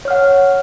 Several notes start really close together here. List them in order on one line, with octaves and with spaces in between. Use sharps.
C#5 F6 F#5